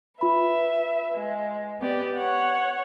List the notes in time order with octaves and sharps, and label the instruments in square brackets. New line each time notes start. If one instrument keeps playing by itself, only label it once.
[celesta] F4 B5 [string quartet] B4 E5
[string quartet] G#3
B3 G4 D5
C#5 F#5